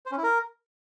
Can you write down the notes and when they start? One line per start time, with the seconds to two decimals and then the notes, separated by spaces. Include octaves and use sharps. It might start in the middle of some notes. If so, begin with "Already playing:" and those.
0.06 C5
0.12 C#4
0.18 E4
0.23 A#4